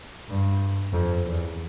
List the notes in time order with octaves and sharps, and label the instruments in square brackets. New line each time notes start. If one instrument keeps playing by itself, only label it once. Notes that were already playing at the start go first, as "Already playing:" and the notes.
[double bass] G2
F2
E2